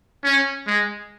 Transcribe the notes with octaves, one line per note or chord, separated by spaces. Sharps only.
C#4
G#3